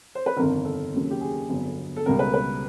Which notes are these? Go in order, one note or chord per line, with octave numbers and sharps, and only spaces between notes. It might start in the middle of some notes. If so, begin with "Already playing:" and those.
C5
B4
G1 F2 C3 D#3 A#4
A4
D#2 C#3 F#3 A#3 C#4
G4
G#4
G1 F2 D3 F#3 B3
A4
C#2 B2 G3 B3 A#4
B4
B4